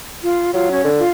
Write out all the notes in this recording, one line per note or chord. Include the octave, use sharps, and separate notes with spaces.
F4
F#3 F4
C#4
D3
F4